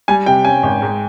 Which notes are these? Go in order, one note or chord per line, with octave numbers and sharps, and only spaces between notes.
G3 G#5
C3 G5
C#4 G#5
G#1
G#2